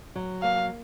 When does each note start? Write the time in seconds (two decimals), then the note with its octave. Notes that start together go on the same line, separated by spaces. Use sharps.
0.15 F#3
0.42 A#3 F5